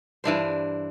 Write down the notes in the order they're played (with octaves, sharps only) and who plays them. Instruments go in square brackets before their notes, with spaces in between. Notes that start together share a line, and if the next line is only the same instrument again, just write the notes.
[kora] G2 E3 D4 C5